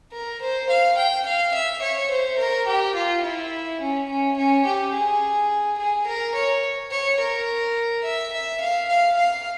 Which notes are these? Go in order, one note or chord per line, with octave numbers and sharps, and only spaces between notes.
A#4
C5
F5
G5
F5
E5
C#5
C5
A#4
G4
F4
E4
C#4
C#4
C#4
G4
G#4
G#4
A#4
C#5
C#5
A#4
E5
E5
F5
F5
F5